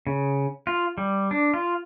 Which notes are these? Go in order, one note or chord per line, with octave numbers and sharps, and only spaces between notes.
C#3
F4
G3
D4
F4